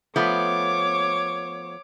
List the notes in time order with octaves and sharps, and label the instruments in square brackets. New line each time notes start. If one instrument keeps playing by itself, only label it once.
[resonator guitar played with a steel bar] F3 A3 B3 [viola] C#5 D6